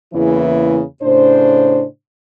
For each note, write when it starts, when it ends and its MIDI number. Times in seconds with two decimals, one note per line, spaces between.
0.13 0.82 40
0.13 0.82 49
0.13 0.82 52
0.13 0.82 58
0.13 0.82 64
1.02 1.84 45
1.02 1.84 49
1.02 1.84 62
1.02 1.84 72